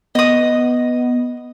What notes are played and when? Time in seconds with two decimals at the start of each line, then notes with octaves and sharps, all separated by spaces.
0.15 B3 D#5 D#6